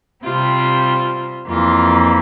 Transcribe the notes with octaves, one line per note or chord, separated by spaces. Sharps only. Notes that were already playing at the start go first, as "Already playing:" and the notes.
C3 G3 C4 F4
F2 E3 A#3 F4